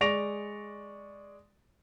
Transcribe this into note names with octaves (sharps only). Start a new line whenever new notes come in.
G#3 D5 C#6 A#6 D7 F7